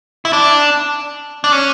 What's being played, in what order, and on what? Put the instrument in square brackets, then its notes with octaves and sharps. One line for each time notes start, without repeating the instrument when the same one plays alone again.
[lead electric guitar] E4
D4
D4
C#4